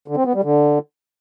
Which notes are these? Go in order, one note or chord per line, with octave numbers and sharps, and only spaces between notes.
D3
C4
B3
G3
D3